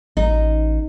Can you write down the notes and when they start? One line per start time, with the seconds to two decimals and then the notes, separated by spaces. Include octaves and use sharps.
0.17 A1 D#4